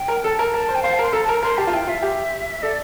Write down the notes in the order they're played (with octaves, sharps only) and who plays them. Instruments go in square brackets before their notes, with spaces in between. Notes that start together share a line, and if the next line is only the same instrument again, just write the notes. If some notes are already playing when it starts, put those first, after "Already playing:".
Already playing: [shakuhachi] G5
[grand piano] A#4
[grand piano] A4 [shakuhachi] A5
[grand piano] A#4 [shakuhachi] A5
[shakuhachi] A#5
[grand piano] A#4 [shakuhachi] A5
[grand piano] C5
[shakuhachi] G5
[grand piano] C5 [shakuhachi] F5
[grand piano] A#4 [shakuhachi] A5
[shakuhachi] C6
[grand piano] A4 [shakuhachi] A#5
[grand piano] A#4 [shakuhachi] A5
[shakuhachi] A#5
[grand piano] A#4 [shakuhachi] C6
[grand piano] G4 [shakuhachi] A5
[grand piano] F4
[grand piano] E4 [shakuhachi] G5
[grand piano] F4 [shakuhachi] E5
[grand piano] G4
[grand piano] A4 [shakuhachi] D5